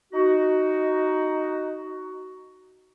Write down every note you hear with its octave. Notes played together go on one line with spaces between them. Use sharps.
D#4 F#4